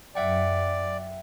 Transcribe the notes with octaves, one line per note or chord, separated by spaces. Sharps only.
F#2 D5 E5 F#5 G5